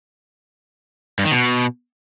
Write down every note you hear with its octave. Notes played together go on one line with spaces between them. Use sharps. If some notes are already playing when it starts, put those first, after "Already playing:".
G2
D#3
B2